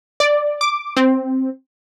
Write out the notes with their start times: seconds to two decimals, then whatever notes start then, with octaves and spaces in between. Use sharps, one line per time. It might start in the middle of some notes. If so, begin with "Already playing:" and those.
0.20 D5
0.61 D6
0.97 C4